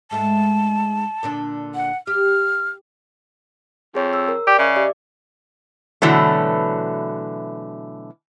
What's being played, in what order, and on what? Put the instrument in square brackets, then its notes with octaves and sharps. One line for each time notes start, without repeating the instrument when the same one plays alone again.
[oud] G#2 G#3 A3 [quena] A5
[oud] A#2 D3 D4
[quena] F#5
[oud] G4 [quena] F6
[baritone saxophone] F2 [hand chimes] G#4 C#5
[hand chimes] E6
A#4
[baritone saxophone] G4 [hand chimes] D5
[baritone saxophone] C#3 [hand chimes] D#5 E5 D6
[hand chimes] G4 D5 E5
[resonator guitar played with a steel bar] B2 D3 E3 F#3 A3